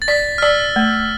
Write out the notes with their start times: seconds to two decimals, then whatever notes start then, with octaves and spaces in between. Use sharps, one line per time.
0.02 A6
0.08 D5 B6
0.38 F6
0.42 D5 E6
0.76 A3